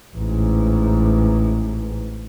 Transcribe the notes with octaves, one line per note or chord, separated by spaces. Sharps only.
A1 G#2